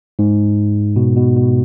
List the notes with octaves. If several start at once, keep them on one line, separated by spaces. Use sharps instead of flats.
G#2
B2
B2
B2